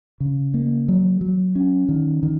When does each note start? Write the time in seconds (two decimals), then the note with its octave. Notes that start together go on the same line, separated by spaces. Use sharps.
0.20 C#3
0.54 A#3
0.88 F#3
1.21 F#3
1.55 C#4
1.89 D#3
2.23 D#3